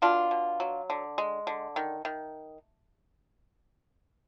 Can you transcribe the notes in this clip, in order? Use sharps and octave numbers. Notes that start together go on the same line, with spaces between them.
B2 D4 F4
B2
F#3
D3
G#3
D3
D#3
D#3